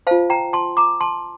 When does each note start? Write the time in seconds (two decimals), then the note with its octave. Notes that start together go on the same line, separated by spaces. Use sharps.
0.07 F4 C5 F5 A5
0.30 G5 A#5
0.53 A5 C6
0.77 A#5 D6
1.01 A5 C6